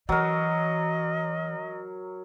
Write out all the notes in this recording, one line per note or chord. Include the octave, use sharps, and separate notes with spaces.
E3 F#3 A#4 D#5